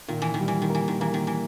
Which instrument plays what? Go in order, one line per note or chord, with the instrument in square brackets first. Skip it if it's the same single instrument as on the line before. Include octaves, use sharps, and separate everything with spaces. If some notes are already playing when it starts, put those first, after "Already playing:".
[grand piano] A#2 [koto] D#3
[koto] E3
D#3
[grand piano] G3
[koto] E3
D#3
[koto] E3 [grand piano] A#3
[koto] D#3
[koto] E3 [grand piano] A#3
[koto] D#3
E3